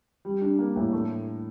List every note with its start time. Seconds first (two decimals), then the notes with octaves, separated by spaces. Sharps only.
0.25 G3
0.42 D4
0.59 A#3
0.76 A2
0.93 A3